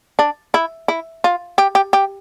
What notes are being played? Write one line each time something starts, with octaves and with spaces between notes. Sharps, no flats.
D4
E4
E4
F4
G4
G4
G4